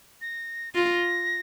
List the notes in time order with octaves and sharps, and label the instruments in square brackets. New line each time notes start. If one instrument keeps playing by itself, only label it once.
[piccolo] A#6
[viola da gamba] F4 [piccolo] A#6